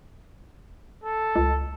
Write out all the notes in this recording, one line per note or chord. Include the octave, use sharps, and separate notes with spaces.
A4
C#2